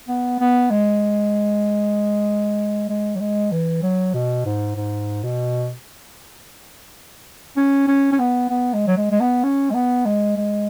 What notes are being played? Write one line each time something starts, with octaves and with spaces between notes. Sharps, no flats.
B3
B3
G#3
G#3
F#3
G#3
E3
F#3
B2
G#2
G#2
B2
C#4
C#4
C#4
B3
B3
G#3
F#3
G#3
G#3
B3
C#4
G#3
B3
G#3
G#3